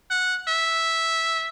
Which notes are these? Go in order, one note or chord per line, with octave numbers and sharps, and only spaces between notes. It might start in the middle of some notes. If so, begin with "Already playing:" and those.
F#5
E5